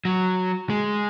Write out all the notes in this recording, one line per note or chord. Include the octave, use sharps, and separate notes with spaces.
F#3
G#3